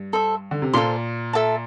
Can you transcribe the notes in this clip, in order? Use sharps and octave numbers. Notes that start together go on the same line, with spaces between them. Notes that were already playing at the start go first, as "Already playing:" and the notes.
Already playing: G2
A4 C5 E5
D3
C3
A#2 A4 C5 F5 C6
A4 E5 A5